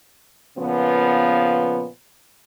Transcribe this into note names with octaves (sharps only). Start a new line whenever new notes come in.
A#2 C#3 F3 B3